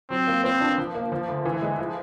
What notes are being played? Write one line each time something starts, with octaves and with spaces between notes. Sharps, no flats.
F#3 C4
A#3
B3 C4
D4
F3
A#3
F3
D2
E3
G#3
F3